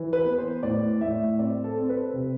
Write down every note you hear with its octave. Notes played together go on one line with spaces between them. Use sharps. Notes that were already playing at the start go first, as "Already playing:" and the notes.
Already playing: E3
B4
B3
C5
A2 D5
A2 E5
C4 D5
A4
C4
B4
C3